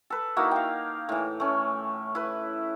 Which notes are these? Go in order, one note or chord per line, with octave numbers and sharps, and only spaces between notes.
A4 B4
A#3 D#4 E4 F#4
F5 G5
A2 E3
A3 C#4
E4 B4